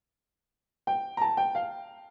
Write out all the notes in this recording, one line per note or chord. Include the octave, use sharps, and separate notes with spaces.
G5
A#5
A5
G5
F5